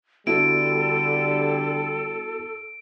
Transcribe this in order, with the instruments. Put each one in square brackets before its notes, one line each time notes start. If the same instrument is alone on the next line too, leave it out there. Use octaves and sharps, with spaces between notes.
[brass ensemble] D3 G3 [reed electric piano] B3 E4 F#4 [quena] A4 [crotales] D7